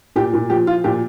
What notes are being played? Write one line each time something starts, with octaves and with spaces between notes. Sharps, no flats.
A#2 G4
A#2
F3 G4
F3 F4
A#2 G4